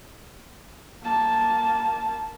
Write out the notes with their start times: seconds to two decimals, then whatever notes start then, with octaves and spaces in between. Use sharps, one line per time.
1.03 A#3 A5